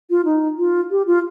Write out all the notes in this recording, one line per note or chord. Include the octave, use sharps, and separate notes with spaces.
F4
D#4
F4
G4
F4